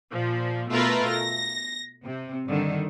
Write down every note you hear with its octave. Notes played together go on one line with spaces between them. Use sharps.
A#2 F3
B2 A3 F4 A#4 B4
A#6
C3
G2 D3 D#3